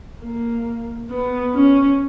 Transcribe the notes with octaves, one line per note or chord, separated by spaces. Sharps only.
A#3
B3
C#4